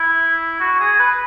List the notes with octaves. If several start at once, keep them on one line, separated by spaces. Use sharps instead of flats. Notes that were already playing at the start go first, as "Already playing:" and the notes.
Already playing: E4
F#4
G#4
B4